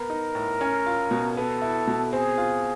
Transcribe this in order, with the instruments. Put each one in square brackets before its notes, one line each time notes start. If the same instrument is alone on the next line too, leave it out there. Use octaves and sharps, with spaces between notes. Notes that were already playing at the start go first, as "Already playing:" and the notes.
Already playing: [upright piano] B3 [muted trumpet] A#4
[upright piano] D#4
A2
C#4
F4
B2
[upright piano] B3 [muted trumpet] A4
[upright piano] E4
B2
[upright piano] C4 [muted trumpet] G#4
[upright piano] F4